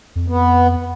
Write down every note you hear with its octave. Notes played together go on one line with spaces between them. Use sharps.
F2
B3